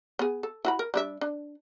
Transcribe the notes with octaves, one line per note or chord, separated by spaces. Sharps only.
B3 G#4
A4
E4 F#4 B5
A#4
G3 D4 E5
D4